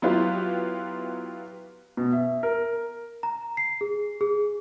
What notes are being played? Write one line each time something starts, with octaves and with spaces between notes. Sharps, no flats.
F#3 B3 E4 F4 G4
B2
E5
A#4
A#5
C7
G#4
G#4